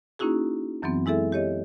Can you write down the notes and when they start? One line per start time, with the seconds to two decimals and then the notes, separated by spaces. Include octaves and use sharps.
0.19 A#3 C#4 D#4 E4 F#4 G#4
0.82 F#2 E3 F#3 B3 C4
1.06 G#3 E4 G#4 A4 E5
1.32 G4 C#5 D#5